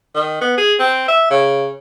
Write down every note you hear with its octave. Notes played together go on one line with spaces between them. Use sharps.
D#3
B3
G#4
C4
E5
C#3